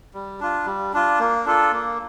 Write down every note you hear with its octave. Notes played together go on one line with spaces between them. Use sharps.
G3
D4 F4
G3
D4 F4
A#3
D4 F4 A4
A#3